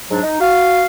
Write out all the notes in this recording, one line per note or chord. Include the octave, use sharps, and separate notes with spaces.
G#2 F#3 D4
D#4
F#4 F5